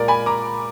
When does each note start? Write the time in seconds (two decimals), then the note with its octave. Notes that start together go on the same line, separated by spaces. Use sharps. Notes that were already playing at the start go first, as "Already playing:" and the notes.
Already playing: A#2 G#3 A#4 D5
0.08 G#5 B5
0.26 A#5 D6